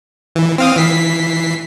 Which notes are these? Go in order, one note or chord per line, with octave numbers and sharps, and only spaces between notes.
E3
C4 F5 D#6
E3 B6 C7